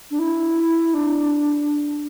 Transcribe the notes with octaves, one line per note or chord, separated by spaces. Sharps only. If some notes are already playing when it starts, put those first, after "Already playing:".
D4
E4
D4